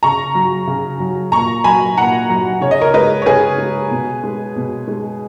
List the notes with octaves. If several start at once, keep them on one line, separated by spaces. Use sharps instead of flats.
C#3 A#5 C#6
F#3
C#3
F#3
A#2 A#5 C#6
F#3 G#5 B5
A#2 F#5 A#5
F#3
C#3 C#5
D#5
A#4 C#5
G#3 B4 D#5
C#5
C#3 G#4 B4
G#3
B2
G#3
B2
G#3